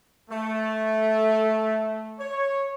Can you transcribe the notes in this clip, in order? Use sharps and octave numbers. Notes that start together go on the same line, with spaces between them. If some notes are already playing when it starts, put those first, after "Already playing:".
A3
C#5